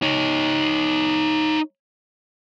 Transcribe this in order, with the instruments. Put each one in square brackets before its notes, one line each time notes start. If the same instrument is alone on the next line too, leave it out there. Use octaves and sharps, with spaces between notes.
[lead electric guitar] D#4 C#5